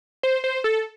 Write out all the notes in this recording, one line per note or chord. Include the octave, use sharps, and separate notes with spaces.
C5
C5
A4